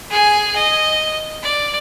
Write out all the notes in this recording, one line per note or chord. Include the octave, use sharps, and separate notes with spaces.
G#4 G#5
D#5
D5